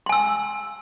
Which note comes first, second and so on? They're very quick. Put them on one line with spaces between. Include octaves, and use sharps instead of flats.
C6 G#5 E6